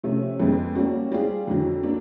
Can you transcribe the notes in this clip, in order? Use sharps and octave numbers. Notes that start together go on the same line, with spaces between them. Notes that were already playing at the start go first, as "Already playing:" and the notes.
C3 F3 A3 C#4
F2 C#3 F3 G#3 B3
G3 A#3 C#4 F#4
G3 C4 F4 G#4
F2 D3 F#3
A#3 D4